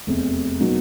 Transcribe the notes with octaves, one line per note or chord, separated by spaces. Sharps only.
F1 E2 C3
B2 F#3 A#3 D#4